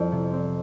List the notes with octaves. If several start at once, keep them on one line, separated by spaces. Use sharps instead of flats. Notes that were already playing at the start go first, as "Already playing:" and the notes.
Already playing: F2 C4
C3
C4